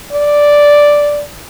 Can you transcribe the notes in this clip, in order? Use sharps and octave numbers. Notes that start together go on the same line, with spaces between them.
D5